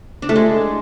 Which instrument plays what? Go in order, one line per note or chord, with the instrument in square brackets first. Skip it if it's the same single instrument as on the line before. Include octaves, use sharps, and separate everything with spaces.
[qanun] D4
A3
G#3